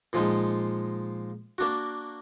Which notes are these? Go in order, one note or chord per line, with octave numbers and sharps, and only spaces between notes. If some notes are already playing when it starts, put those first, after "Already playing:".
A#2 F3 G#3 D#4
A#3 D4 F#4